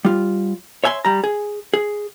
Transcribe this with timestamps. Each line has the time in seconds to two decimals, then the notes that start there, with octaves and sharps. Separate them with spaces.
0.05 G3 F4
0.84 C#5 E5 G#5 B5 C6
1.05 G3 A#5
1.24 G#4
1.74 G#4